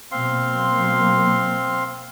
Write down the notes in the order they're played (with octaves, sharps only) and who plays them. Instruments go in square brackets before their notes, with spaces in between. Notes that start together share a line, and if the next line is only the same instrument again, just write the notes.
[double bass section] B2 F#3 A#3 [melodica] C4 F5 C6